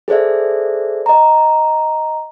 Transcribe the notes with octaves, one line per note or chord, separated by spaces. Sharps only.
G#4 A4 C5 D5 E5
D#5 A#5